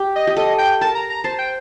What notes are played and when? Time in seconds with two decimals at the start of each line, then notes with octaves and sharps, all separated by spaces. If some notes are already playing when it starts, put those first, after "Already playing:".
Already playing: G4
0.16 D#5
0.27 G4
0.36 A4 D#5
0.58 G5
0.81 A#4 A5
0.95 A#5
1.10 A#5
1.24 C5 A5
1.39 G5